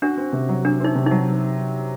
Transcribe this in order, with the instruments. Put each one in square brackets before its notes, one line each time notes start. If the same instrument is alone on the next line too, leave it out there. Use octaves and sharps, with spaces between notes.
[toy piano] D4 [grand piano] F#4
[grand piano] C4
C3
F#3
[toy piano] D4 [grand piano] F#4
[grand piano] C4 [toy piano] D#4
[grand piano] C3
[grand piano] F#3 [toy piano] D#4